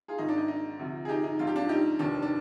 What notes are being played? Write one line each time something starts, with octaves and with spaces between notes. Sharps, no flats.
F4 G#4
G#1 G#2 D#3 D#4
D4
D#4
D#4
D2 C3 F3
G#4
D#4 G4
D#4
A#1 G#2 F3 F4
G4
D4 F4
D#4 G4
F1 D#2 D#3 D4
D4